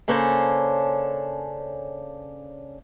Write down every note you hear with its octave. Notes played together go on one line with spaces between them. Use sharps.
C#3 A#3 C#4 D4 A4 C5